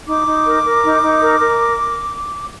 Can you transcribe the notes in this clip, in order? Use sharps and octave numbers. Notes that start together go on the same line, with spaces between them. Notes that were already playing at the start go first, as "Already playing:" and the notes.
D#4 D6
D#4
A#4
A#4
D#4
D#4
A#4
A#4